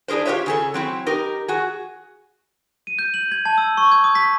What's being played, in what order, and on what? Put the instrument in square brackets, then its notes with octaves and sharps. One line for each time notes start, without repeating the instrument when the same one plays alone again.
[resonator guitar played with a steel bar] D4 E4 G#4 A#4 C5
F4 G4 B4 C#5 E5
C#3 G#4 A4
F#3 C4 E4
D#4 G4 A#4
F#4 G#4
[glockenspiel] D#7
G6
F#7
G#6
A5
E6
C#6
G#6
D#6
B6